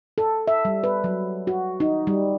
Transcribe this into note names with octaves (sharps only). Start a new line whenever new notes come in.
A4
E5
G3
B4
F#3
F#4
D#4
G3